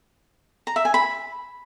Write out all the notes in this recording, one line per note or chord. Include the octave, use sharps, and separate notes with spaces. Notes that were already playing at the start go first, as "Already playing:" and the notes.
A#5
E5
G#5
B5